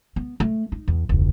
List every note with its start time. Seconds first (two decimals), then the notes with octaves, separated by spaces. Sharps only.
0.16 B3
0.40 A3
0.72 D#4
0.88 E2
1.09 E1 C#2